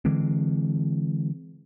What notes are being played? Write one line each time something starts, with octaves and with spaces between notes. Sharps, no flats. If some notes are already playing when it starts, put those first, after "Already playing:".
D3 E3 G#3 C4